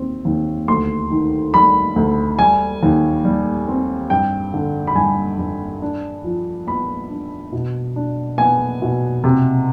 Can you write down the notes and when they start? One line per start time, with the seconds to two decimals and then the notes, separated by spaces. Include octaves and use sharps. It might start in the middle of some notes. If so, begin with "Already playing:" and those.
Already playing: D#2 C4
0.25 D#2
0.68 D2 C6
1.11 D#3
1.54 G3 B5
1.96 D2
2.39 G3 G#5
2.83 D#2
3.25 G3
3.68 C4
4.10 G2 G5
4.54 D3
4.87 B5
4.95 G2 G#5
5.39 G2
5.82 D4
6.24 F3
6.67 B3 B5
7.10 D4
7.52 B2
7.96 D4
8.38 B3 G#5
8.82 B2
9.24 C3